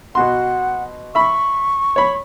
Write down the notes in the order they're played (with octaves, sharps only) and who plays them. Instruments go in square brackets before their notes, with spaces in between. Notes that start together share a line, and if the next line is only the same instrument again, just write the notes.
[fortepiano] B2 F#4 C6 [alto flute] F#5
[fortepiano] E5 B5 [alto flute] C#6
[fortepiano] C#5 B5